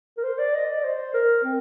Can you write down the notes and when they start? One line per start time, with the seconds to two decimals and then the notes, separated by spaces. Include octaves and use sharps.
0.18 A#4
0.23 C5
0.39 D5
0.54 D#5
0.69 D5
0.84 C5
1.14 A#4
1.44 C4